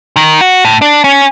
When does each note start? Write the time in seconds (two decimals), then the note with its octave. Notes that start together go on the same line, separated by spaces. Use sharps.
0.16 D#3
0.41 F#4
0.65 A2
0.82 D4
1.04 C#4